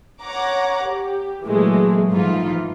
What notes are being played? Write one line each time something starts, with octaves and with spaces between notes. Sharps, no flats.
C#5 F#5 A#5 D6
G4
A#2 E3 F#3 G#3 A3
G#2 E3 F3 D#4 F4